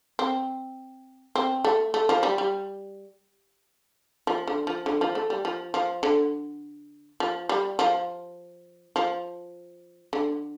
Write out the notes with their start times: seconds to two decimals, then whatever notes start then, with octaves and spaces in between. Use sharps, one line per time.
0.19 C4
1.35 C4
1.64 A3
1.94 A3
2.09 F3
2.23 G3
2.38 G3
4.27 F3
4.47 D3
4.67 F3
4.86 D3
5.01 F3
5.15 A3
5.30 G3
5.45 F3
5.74 F3
6.03 D3
7.20 F3
7.49 G3
7.79 F3
8.96 F3
10.13 D3